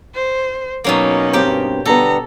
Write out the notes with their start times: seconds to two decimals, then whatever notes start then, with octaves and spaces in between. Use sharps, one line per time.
0.14 C5
0.84 B2 F#3 A#3 C#4 D#4
1.33 G2 C4 G4 G5 A#5
1.85 D3 G3 B3 A4 A#5